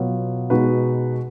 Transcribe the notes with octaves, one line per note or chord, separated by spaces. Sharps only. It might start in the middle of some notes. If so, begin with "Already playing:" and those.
Already playing: B2 F#3 B3 F4
B2 G#3 D#4 F#4 B4